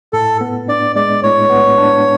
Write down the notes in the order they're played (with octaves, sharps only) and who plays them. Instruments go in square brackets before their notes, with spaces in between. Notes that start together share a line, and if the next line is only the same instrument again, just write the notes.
[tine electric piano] A2 [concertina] A4
[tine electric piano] B3
[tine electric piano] D4 [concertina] D5
[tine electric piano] G#3 [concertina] D5
[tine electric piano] A2 [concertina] C#5
[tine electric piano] B3
D4